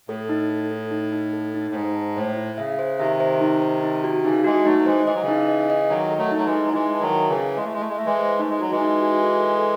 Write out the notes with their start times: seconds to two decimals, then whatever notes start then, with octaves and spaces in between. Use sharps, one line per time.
0.08 A2 A4
0.29 D#4
0.49 A4
0.71 A4
0.91 D#4
1.12 D#4
1.33 A4
1.54 D#4
1.71 A2
1.74 G#2 C5
1.95 A5
2.16 A2 C5
2.37 E4
2.58 C#3 E5
2.79 C5
2.99 C3 D#3 E5
3.20 C5
3.41 D#4
3.62 C5
3.83 D#4
4.04 F#4
4.24 C#3 E3 D#4
4.44 E3 G#3 F#4
4.66 F#3 A3 D#4
4.78 F#3
4.86 E3 G#3 C5
5.07 E3 D#5
5.15 F#3
5.22 C#3 E3
5.28 D#4
5.48 D#5
5.70 D#5
5.90 D#3 F#3 D#5
6.11 A4
6.18 F#3 A3
6.32 D#4
6.39 F#3
6.46 E3 G#3
6.53 D#4
6.66 F#3
6.74 E3 G#3 E4
6.94 A5
7.01 D#3 F#3
7.15 E5
7.29 C#3 E3
7.36 E4
7.57 G#3 E5
7.65 A3
7.73 G#3
7.77 A3 E4
7.89 G#3
7.98 A3 E5
8.05 E3 G#3
8.19 C5
8.40 A3 D#4
8.50 G#3
8.60 F#3 F#4
8.71 E3 G#3
8.81 D#4
9.02 F#4
9.23 A4
9.44 A4